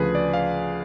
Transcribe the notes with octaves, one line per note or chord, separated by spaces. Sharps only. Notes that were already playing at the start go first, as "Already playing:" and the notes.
Already playing: D2 C#3 F3 G#4 B4
D5
F5